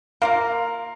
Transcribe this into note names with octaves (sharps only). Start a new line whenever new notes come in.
A#3 F4 A#4 F5